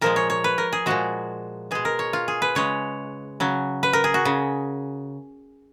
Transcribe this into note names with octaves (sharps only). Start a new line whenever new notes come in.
A#2 F3 G#3 A#4
C#5
C#5
B4
A#4
G#4
A#2 F3 G#3 F#4
B2 G#3 G#4
A#4
C#5
F4
G#4
B4
C#3 G#3 C#5
C#3 F#3
B4
A#4
G#4
F#4
C#3